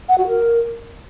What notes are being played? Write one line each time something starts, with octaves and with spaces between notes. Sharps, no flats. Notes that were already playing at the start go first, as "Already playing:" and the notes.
F#5
F#4
A#4